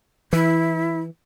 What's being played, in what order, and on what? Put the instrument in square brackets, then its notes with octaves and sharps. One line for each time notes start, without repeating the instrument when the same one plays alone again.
[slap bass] E3 [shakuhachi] E4